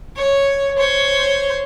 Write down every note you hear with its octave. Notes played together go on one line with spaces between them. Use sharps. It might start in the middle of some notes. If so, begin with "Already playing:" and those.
C#5
C5 C#5